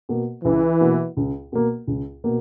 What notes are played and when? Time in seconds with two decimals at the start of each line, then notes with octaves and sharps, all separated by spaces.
0.09 B2 A#3
0.44 C#2 E3
0.81 B2 A#3
1.17 C#2
1.52 B2 A#3
1.87 C#2
2.24 B2 A#3